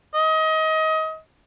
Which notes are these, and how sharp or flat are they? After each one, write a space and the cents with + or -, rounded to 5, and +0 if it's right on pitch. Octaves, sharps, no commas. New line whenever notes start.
D#5 +25